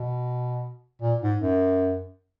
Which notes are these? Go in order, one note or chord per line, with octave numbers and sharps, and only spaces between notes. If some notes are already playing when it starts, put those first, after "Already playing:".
Already playing: B2
A#2
G#2
F#2